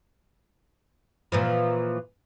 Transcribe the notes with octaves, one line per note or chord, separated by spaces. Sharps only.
A#2 E3 F3